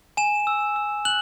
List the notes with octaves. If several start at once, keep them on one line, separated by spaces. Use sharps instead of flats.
G#5 E7
E6
E6
F#6 F#7